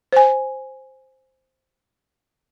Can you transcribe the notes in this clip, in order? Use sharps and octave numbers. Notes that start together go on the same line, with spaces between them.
C5 G#5